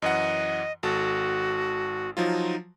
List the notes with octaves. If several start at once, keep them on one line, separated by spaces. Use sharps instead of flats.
F#2 E3 D#5 F#5
G#1 F#4 A4 A5
F3 F#3 D#4 F4